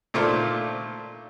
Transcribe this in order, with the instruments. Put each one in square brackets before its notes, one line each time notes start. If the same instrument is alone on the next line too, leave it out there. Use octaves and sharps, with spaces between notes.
[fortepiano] A#2 A3 D4 F4 C5